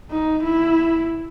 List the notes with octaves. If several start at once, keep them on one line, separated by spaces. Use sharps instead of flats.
D#4
E4